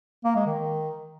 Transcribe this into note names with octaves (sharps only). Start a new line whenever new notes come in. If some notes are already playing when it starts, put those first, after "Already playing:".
A#3
G#3
D#3